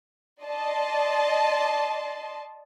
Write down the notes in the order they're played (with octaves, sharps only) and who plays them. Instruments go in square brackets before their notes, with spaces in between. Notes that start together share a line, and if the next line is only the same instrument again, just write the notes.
[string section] D5 D#5 A5 C6